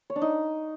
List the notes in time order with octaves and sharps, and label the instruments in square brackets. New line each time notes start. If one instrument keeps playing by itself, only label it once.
[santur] C#5
D4
D#4